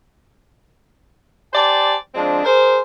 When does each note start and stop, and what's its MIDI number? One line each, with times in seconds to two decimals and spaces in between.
1.54 1.95 67
1.54 1.95 72
1.54 1.95 74
1.54 1.95 80
1.54 1.95 81
2.15 2.44 53
2.15 2.44 56
2.15 2.44 60
2.15 2.44 62
2.45 2.80 68
2.45 2.80 70
2.45 2.80 72